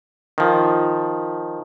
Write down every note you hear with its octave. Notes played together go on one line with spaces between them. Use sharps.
D#3 F3